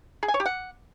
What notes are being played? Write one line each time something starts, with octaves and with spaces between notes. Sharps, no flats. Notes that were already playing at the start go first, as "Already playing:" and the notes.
G#4
G#5
C#5
G4
F#5